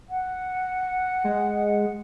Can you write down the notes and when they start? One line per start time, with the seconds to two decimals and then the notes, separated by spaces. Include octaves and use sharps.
0.09 F#5
1.24 G#3